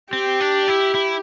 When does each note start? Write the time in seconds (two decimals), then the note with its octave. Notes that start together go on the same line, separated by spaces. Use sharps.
0.12 C4 G4
0.40 D4
0.68 E4
0.94 E4